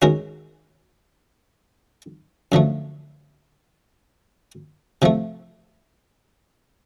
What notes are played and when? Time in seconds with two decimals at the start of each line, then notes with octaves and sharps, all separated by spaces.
0.02 D#3 G#3 C#4 F#4 A#4
2.52 F#2 D3 F3 A3
5.02 C3 F3 A3